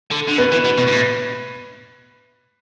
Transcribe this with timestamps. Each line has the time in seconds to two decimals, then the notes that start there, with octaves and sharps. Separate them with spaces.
0.11 D3
0.28 D3
0.38 B2 B4
0.52 E3
0.65 B2
0.78 B2
0.88 G2
0.93 A2